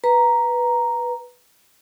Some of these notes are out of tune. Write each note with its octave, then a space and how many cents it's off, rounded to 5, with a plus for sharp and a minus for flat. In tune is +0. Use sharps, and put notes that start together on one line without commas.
B4 -5 A#5 +0